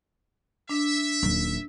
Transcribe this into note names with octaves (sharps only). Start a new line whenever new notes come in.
D4 E5
D#1 F#3